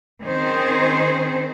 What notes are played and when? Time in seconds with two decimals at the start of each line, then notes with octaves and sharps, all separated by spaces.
0.23 D#3 C4 C#4 G#4 C5